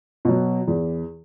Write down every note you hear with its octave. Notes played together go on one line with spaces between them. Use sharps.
B2 F#3
E2